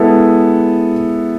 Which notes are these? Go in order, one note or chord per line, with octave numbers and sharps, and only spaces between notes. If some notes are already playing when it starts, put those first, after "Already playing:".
Already playing: G#3 B3 E4 A4